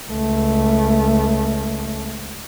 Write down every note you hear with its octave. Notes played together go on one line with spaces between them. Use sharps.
C#2 A3